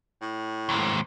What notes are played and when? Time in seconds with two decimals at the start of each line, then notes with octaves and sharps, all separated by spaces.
0.21 A2
0.69 D#2 G#2